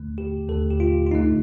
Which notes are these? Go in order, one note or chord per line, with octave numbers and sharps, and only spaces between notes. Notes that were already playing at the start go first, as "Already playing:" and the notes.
Already playing: D#2 D3 A3
G4
D#2 D3 A3 A4
G4
F4
F4
D2 D3 A3 D#4